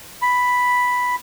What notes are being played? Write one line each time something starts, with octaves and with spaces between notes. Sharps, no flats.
B5